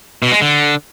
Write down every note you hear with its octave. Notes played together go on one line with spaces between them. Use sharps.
B2
G#3
D3